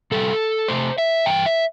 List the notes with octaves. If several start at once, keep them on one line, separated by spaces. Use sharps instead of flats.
C3 G3 A4
C3 A3 C5
E5
G2 E3 G5
E5